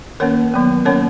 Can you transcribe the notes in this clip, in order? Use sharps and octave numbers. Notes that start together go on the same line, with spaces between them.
D#3 A#3 C#4 A#4 C#5
D#3 F#3 B3
D#3 A#3 C#4 A#4 C#5